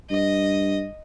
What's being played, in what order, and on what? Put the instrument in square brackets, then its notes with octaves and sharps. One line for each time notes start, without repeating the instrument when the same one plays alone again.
[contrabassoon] G2 [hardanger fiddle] D#5